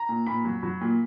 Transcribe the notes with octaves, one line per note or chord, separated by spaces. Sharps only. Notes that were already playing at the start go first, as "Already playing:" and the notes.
Already playing: A#5
A#2
A#2 B5
F#3
F#3
A#2